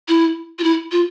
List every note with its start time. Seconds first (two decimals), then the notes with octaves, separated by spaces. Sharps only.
0.08 E4
0.59 F4
0.64 E4
0.92 F4